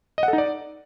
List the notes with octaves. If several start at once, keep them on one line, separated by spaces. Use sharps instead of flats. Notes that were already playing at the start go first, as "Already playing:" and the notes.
D#5
F#5
A4
D#4
D5